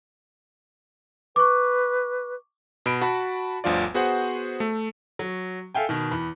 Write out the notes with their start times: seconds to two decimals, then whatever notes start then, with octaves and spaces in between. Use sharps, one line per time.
1.36 B4 C#6 D6
2.86 B2 B5 D7
3.01 F#4 A5 B5
3.64 G1 D2 F3 F4 D5
3.94 B3 F#4 G#4 C5 F#5
4.60 A3
5.19 F#3
5.75 A4 E5 F5 G5 G#5
5.89 B2 D#3
6.11 E2 B5